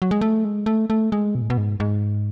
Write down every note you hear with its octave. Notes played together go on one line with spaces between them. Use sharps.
F#3
G#3
A3
G#3
A3
A3
G#3
B2
A2
B2
G#2
G#2